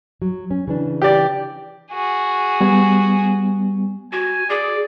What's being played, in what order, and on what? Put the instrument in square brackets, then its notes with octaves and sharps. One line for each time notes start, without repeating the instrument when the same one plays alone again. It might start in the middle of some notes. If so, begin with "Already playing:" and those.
[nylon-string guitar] F#3
C#4
C#3 E3 D4
[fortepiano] G4 D5
[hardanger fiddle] F#4 G#4
[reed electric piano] G3 B3 G#5
[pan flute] F#4 [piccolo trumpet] G#5
[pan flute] G#4 [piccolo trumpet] D5